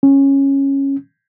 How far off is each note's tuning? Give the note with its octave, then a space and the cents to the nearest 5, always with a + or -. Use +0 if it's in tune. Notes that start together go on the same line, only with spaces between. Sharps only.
C#4 -10